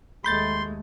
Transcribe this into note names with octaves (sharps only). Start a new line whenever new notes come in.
D#2 G#3 A3 B5 C6 G6 A6